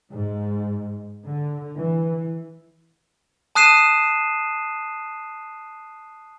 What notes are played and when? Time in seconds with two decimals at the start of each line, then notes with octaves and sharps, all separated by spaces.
0.10 G#2
1.25 D3
1.79 E3
3.55 A5 D#6 F#6 C7 D#7 E7